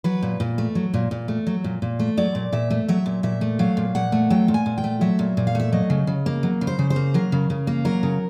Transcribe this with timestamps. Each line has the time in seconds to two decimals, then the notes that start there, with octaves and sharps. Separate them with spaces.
0.04 F#3 B4
0.23 A#2
0.40 A#2
0.58 A3
0.75 F#3
0.94 A#2
1.11 A#2
1.28 A3
1.47 F#3
1.64 A#2
1.82 A#2
1.99 A3
2.17 F#3 D5
2.35 A#2
2.52 A#2 E5
2.70 A3
2.88 F#3 E5
3.06 A#2
3.23 A#2 E5
3.41 A3
3.59 F#3 F5
3.77 A#2
3.95 A#2 F#5
4.12 A3
4.30 F#3 G5
4.48 A#2
4.54 G#5
4.66 A#2
4.78 G5
4.84 A3
5.01 F#3 E5
5.19 A#2
5.37 A#2
5.47 F5
5.55 A3 E5
5.72 F#3 D#5
5.90 C#3
6.07 C#3
6.26 A#3
6.43 F#3
6.61 C#3
6.67 C5
6.79 C#3
6.90 C5
6.96 A#3
7.14 F#3 A#4
7.32 C#3
7.50 C#3
7.67 A#3
7.85 F#3 A#4
8.03 C#3